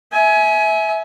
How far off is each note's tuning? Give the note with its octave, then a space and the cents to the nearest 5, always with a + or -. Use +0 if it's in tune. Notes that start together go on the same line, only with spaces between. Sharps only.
E5 -15 G#5 +25